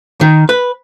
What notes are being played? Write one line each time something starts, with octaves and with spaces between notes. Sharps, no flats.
D#3
B4